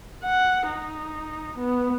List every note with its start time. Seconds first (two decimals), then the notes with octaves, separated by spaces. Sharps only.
0.24 F#5
0.68 D#4
1.58 B3